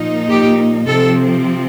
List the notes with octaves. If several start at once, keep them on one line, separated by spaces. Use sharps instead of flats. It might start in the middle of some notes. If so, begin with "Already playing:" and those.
Already playing: A#2 F3 A#3 D#4
G4
C3 F3 C4 A4